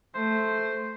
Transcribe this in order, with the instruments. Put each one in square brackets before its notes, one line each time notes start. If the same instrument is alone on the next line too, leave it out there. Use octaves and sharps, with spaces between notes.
[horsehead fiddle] A3 [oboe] C5